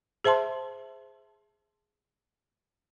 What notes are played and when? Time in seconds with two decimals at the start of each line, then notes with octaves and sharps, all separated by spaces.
0.24 G#4 C5 E5 A5 C6